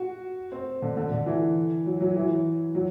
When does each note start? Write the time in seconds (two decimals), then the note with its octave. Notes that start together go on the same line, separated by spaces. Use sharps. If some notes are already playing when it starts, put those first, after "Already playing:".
Already playing: F#4
0.52 C4
0.82 D3
0.97 D3
1.11 D3
1.26 E3
1.86 F#3
2.01 F#3
2.16 E3
2.75 F#3